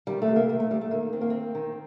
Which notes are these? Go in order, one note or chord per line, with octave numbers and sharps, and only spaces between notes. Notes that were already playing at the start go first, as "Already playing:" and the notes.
D#3 G3
A3
C3
A#3
D#3 A#3
A3
D#3 G3
A3
D#3 A#3
D#3 C4
A#3
D#3 C4
D#3